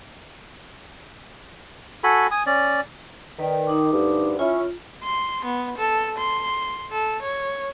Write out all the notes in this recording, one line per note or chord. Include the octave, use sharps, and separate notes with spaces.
F#4 A4 G#5 B5
G#5 D#6
C#4 D5
D#3 B4 D5 G5
D#4 D6
D2 G2 D3
C#4 E4 F4
C6
B3
A4
C6
A4
C#5